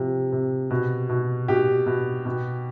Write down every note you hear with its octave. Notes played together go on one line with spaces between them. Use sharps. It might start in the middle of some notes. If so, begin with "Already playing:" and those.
Already playing: C3 F3
C3
B2
B2
B2 G4
B2
B2